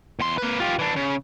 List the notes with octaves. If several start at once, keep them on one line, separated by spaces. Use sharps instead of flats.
E2 C6
A#3 B4
F4 G4
E3 D4
C#3